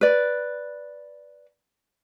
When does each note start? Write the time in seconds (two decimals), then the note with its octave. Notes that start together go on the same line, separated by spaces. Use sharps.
0.01 B4 D5